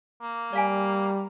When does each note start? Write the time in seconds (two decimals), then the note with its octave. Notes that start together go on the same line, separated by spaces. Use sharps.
0.22 A#3
0.53 G3 D5 F5 G#5